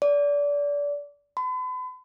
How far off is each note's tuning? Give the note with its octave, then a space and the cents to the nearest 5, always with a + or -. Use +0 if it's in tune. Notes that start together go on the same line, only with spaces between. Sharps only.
D5 -25
B5 +40